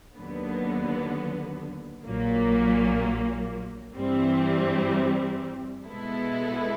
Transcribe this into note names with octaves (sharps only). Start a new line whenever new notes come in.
D#2 D3 F#3 B3
A#1 A#2 F#3 A#3
G2 E3 G3 C4
B2 G#3 B3 E4 A4